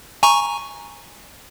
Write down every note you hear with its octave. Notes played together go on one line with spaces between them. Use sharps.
G#5 A#5 C#6